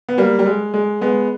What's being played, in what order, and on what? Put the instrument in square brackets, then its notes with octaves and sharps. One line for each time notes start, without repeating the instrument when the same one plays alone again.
[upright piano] B3
G3 A#3
G3
G#3
G#3
G#3 B3